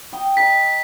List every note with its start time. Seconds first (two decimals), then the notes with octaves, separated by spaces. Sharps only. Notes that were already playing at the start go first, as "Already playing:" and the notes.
0.12 G5 D#6
0.37 D#5 A#5 B6